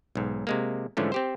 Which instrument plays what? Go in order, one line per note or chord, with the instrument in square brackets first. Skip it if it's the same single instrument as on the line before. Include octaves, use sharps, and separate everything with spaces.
[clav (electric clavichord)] B1 G#2
C3 G#3 A#3
G#2 D3 E3 F3 A3 C#4
C4 G4 C5